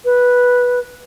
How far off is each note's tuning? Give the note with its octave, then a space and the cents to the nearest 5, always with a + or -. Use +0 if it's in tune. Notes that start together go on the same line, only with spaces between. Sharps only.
B4 -10